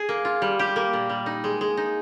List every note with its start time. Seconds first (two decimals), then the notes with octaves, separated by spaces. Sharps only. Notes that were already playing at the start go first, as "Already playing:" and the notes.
Already playing: G#4
0.09 A#3
0.25 F4
0.42 G3
0.59 G4
0.76 A#3
0.93 A#2
1.09 G3
1.26 D#4
1.44 G#3
1.61 G#3
1.77 D#4